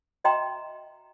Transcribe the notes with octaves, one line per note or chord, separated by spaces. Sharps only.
F#4 D#5 E5 G5 A#5 C6